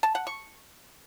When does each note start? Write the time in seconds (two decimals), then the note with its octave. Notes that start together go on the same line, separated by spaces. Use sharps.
0.03 A5
0.15 F#5
0.27 C#6